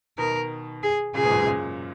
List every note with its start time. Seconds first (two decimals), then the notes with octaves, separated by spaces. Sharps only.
0.18 B2 D#3 A#4
0.83 G#4
1.14 A#2 C#3 G#4
1.23 G#2 B2
1.31 F#2 A#2
1.38 G#2 B2
1.46 F#2 A#2